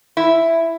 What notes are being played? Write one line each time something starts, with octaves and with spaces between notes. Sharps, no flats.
E4